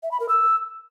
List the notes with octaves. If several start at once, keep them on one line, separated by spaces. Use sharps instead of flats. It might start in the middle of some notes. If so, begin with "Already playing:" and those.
E5
B5
A#4
E6